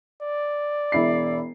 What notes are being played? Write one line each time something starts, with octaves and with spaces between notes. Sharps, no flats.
D5
E1 E4 C7